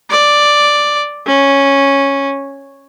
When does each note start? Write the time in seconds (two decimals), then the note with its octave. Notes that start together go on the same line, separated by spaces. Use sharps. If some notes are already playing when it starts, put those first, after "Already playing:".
0.10 D5
1.27 C#4